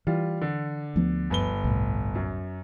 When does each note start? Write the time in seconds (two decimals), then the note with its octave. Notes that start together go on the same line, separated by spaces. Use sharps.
0.07 E3 G3 F4
0.41 D3
0.96 D2 F3 B3
1.30 G1 B4 G7
1.64 C2 A2
2.15 F#2